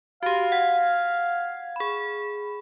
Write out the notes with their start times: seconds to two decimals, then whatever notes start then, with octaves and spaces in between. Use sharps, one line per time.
0.23 F#4 G4 F5
0.52 F#5 G#6
1.76 G#4 B5